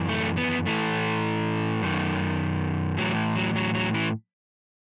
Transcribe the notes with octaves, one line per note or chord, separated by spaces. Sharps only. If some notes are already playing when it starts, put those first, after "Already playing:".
Already playing: F#2 E3
A3
B3
A2 E3 A3
F#2 D#3
A2 E3 F#3
F#3
F#3
F#3
E3